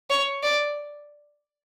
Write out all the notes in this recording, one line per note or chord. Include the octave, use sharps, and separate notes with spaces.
C#5
D5